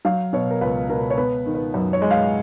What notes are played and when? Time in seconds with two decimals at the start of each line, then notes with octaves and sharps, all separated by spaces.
0.05 F#3 F5
0.33 B2 C#5
0.50 A#4
0.61 C#2 B4
0.89 B2 A#4
1.10 C#5
1.17 B3 B4
1.46 D#3
1.55 B4
1.74 F#2 B4
1.93 C#5
2.02 G#3
2.11 F5